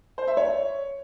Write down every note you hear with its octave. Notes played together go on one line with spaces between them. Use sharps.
C5
E5
C#5